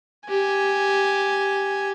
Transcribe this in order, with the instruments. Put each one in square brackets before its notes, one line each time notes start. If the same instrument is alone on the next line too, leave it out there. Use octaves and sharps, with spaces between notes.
[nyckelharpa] G4 G#5